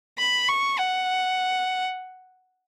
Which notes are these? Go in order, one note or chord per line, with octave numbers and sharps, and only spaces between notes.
B5
C#6
F#5